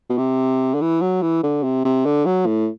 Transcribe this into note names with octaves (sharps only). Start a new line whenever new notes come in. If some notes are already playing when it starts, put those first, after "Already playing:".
B2
C3
D3
E3
F#3
E3
D3
C3
C3
D3
F#3
A2